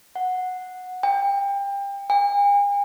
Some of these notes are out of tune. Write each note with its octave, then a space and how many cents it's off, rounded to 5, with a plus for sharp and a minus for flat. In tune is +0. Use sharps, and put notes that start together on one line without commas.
F#5 -10
G5 +30
G#5 -45